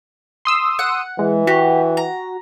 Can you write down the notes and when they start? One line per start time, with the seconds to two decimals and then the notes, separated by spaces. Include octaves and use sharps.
0.45 C6 D#6 E6
0.79 F#5
1.19 E3 G#3
1.47 F#4 G4
1.97 A#5